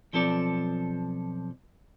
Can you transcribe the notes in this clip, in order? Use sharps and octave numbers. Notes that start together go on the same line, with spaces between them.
B1 F3 C4 A4 D5